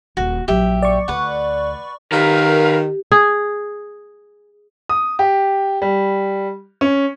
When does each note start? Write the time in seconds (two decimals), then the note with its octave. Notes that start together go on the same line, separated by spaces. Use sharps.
0.17 D#1 F#4
0.48 A#1 F#3 G4 E5
0.82 D5 C#6
1.08 D2 B4 F#5
2.12 D#3 G4 A#4 B4 F5
3.12 G#4
4.89 D#6
5.19 G4
5.82 G3
6.81 C#4